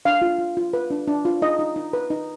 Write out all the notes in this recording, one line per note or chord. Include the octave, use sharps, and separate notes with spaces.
D4 F5
F4
F4
F4
B4
D4
D4
F4
D#4 D#5
D#4
D#4
B4
D#4